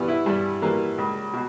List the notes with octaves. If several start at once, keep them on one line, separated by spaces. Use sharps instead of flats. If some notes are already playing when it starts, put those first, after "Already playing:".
Already playing: G2 E3 G3 B3
E4
G2 G3
E3 G3 A#3
C#2
B2